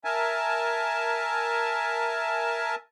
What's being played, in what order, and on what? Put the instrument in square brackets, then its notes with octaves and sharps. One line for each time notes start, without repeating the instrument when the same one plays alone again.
[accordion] A#4 E5 G#5 A5